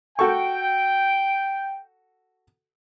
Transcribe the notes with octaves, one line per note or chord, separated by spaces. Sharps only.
F#4 A4 G5 C#6